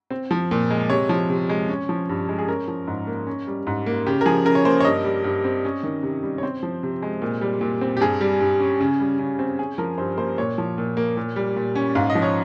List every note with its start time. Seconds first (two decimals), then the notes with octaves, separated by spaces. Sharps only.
0.11 C4
0.31 F3
0.51 A#2
0.71 G#3
0.90 C3 C#5
1.09 F3
1.30 C3
1.49 G#3
1.69 C#4
1.89 F3
2.09 G2
2.29 G#3
2.39 G#4
2.48 C#4 A#4
2.68 F3
2.88 G#2
3.07 A#3
3.27 C#4
3.47 G3
3.67 G#2
3.86 A#3
4.06 C#3 G4
4.21 A#4
4.26 F3 G#4
4.45 C#3 A#4
4.55 C#5
4.65 A#3 C5
4.80 C#5
4.85 G2 D#5
5.04 G3
5.24 G2
5.44 C4
5.65 C#4
5.83 D#3
6.03 C3
6.23 G3
6.38 C#5
6.43 C4 C5
6.63 F3
6.83 C3
7.02 G#3
7.22 A#2
7.41 G3
7.61 A#2
7.81 C4
7.97 G4
8.00 G2 G#4
8.21 G3
8.40 G2
8.60 C#4
8.80 C#3
9.00 G3
9.19 C#3
9.39 C4
9.59 C#4 G#4
9.78 F3 A#4
9.98 G2 C5
10.18 A#3 C5
10.38 A#2 C#5
10.58 F3
10.78 A#2
10.97 A#3
11.17 A#2
11.36 G3
11.56 A#2
11.75 C#4
11.95 G#2 F5
12.10 D#5
12.15 F3
12.22 C#5